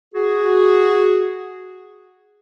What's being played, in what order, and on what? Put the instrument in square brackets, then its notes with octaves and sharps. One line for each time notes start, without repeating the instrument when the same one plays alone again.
[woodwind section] F#4 G#4